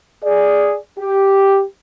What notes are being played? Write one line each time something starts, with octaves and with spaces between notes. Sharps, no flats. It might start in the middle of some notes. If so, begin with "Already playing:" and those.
G#4 D5
G4